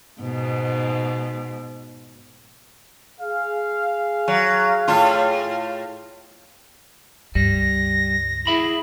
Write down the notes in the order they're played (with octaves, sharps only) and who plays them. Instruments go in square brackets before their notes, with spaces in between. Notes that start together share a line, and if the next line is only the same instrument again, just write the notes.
[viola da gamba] G#2 B2
[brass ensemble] G#4 F5
[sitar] F#3
A2 F4
[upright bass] C#2 G2 [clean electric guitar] G3 [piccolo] A#6
[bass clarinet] E4 [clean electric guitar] G#4 E5 B5